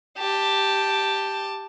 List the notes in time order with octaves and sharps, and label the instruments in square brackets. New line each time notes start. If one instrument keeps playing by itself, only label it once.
[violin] G4 A5